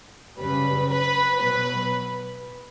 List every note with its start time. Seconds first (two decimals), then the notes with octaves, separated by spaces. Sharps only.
0.38 F#2 C#3 G3 B4
0.89 B4
1.40 B2 F#3 B4